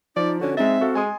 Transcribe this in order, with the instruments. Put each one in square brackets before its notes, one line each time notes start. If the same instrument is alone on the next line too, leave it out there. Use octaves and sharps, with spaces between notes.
[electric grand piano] F3 [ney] D#4 [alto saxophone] D5
[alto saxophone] D3 [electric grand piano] C#4 F#4 [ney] C#5
[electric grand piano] G#3 D#4 A6 [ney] C4 [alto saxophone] E5
[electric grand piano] F#4 A4 F5
[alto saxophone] G#3 [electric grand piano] G#5 C6 D#6